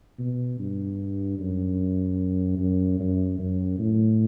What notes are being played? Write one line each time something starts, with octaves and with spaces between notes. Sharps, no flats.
B2
G2
F#2
F#2
F#2
F#2
A2